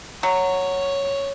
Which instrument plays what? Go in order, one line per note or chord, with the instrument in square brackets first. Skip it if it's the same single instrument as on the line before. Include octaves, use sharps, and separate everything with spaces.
[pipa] F#3 [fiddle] C#5